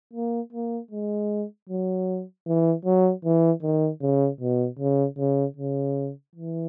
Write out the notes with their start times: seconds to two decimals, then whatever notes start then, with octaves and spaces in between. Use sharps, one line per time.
0.13 A#3
0.53 A#3
0.91 G#3
1.69 F#3
2.47 E3
2.85 F#3
3.25 E3
3.63 D#3
4.02 C#3
4.40 B2
4.79 C#3
5.18 C#3
5.57 C#3
6.35 E3